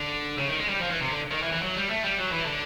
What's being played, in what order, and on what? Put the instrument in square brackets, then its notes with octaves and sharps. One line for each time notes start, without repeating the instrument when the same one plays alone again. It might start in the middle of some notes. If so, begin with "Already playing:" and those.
Already playing: [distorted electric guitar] D3
C#3
D#3
G#3
G3
F3
E3
C3
D3
D#3
E3
E3
F#3
G3
A3
G3
F#3
E3
D3